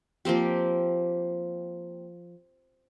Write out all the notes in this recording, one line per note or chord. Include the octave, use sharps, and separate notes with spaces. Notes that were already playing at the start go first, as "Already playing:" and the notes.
F3 A#3 C4 G4